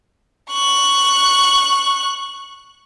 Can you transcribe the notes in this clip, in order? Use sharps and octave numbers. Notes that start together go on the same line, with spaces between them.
C#6 F#6